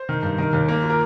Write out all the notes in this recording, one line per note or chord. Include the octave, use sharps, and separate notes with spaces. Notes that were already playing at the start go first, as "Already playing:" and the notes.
Already playing: C5
D#3
G2
D#3 A#4
D#2
A#3
F4
A#4